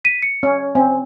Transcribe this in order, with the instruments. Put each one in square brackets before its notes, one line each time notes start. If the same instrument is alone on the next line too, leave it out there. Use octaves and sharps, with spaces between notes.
[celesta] B6 D#7
C#7
[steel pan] C#4
[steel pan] C4 [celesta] G#5